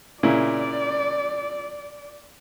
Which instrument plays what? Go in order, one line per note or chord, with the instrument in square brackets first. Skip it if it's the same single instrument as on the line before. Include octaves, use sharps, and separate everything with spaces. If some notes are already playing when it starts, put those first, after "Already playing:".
[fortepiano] A#2 C#3 E4 [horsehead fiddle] D5